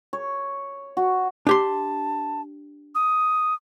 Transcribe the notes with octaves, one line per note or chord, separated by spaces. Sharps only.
C#5
F#4
D4 G4 A5 C6
D#6